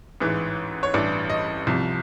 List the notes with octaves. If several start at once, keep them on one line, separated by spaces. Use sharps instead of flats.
A1 G#2 E3
C#5
A1 G2 E3 D5
D#5
C2 C3 F3